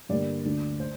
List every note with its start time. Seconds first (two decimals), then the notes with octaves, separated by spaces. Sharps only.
0.09 G2 D3 G3 A#3 D5
0.45 D2 D3 A3
0.80 C5